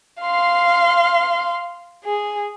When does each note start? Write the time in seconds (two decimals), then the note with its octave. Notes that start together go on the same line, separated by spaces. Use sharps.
0.22 F5 C6
2.04 G#4